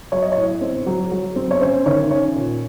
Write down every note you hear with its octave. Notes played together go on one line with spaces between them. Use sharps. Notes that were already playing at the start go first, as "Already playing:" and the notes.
F#3 C#5
D#5
C#5
A2
C4
F#3
F#3
C4
C#5
C#4 C5
D#3 C#5
C#4 C#5
A#2